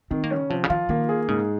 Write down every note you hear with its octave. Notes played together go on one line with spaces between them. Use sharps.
D#3 C4
A#3
C#4
C#3
C3 F3
C#3
D#3 F4
D#3 A#3
G#4
G#2 C#3